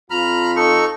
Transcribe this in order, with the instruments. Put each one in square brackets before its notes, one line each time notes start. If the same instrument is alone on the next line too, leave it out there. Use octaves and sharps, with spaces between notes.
[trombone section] F2 F3 F4 [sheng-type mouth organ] A#5 B5 F6
[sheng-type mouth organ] D#4 A4 C#6